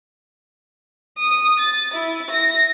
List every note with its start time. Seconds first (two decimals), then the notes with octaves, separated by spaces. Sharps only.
1.19 D#6
1.59 A6
1.94 E4
2.30 A#6